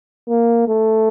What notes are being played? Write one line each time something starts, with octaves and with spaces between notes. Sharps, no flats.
A#3
A3